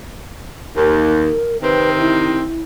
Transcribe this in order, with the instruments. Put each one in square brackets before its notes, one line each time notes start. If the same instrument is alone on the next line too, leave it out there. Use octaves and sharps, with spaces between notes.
[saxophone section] D#2 [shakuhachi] A#4
[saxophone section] C3 D#3 C4 [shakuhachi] B4
[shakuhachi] E4